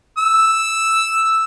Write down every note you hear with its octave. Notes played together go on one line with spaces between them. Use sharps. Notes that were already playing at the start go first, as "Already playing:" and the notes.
E6